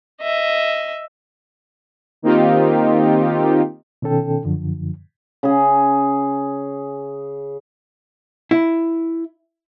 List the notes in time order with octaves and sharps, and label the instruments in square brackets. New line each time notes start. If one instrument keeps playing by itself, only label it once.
[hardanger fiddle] D#5 E5
[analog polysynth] D#3 A#3 C4 D#4 F4 G4
[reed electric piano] B2 D#3 C#4 A4 G5
F#2 D3 F3
[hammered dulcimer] C#3 G#4
[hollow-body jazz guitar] E4